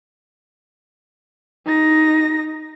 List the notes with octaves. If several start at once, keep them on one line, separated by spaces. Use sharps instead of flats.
D#4 A#6